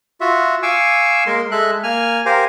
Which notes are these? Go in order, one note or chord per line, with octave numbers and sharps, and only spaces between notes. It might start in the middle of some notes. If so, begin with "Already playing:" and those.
F4 F#4 E5
F5 G#5 C#6 D6 E6
G#3 A#3 A#4 C6
G#3 A4 E5 F#6
A#3 G#5 F6
G4 A#4 C5 F5 G#5